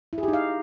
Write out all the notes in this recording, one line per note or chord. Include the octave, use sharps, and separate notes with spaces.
E4
G#4
G4
D#4
F5